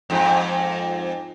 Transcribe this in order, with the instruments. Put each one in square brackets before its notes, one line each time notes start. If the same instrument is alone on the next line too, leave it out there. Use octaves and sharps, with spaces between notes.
[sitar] F2 G#2